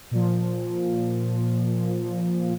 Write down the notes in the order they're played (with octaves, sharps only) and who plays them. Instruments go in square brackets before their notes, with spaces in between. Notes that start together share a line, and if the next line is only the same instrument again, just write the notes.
[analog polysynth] A#2 F3